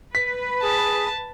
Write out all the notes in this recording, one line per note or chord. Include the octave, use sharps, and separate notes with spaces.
B4 B6
G#4 A5